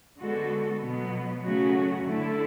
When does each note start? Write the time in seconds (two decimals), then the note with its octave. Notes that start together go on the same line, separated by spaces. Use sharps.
0.19 D3 G#3 B3 F#4 A4
0.81 B2 F#3 B3
1.42 C#3 F#3 A3 C#4 F#4
2.04 D3 A3 E4 A4